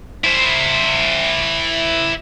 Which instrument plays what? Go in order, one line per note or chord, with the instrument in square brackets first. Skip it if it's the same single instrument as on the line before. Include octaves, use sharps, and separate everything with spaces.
[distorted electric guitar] E4 C5